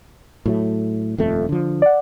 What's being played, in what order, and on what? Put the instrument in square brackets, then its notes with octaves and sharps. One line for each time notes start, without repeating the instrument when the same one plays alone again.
[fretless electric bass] A2 F#3 A3
D#1 F2 A3
D3 F3
[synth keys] D5 F#5